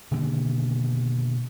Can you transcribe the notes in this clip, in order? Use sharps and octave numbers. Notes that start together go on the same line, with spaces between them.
B2 D3 D#3 A#3